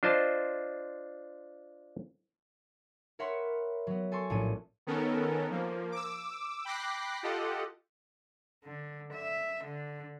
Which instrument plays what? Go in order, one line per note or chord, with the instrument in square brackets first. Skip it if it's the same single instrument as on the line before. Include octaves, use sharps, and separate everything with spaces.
[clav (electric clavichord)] D4 F4 C5 D#5 A5
[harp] A#4 C#5 E5 F#5 B5 C6
F#3 B3
A4 G#5 C6 C#6
A#1 A2 C#4 D#7
[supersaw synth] D#3 B3 C#4 A4 A#4
F3 A#3
D6 E6
G5 B5 D6 F#6 A#6 C7
F4 G4 A4 D#5 F#5
[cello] D3
E5
D3